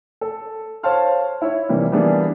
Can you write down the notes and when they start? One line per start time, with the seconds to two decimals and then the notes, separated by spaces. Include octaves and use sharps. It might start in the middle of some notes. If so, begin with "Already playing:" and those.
0.21 A4
0.83 C5 C#5 F5 A5 C6 F6
1.42 E4 C#5
1.69 C3 E3 G3 A#3
1.92 E3 G3 A#3 B3 D4 G#4